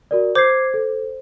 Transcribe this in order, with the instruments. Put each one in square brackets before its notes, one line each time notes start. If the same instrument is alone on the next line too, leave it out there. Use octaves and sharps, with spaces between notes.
[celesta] F#4 A#4 D5
[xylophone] C5 [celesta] D6 G#6 C7
[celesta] A4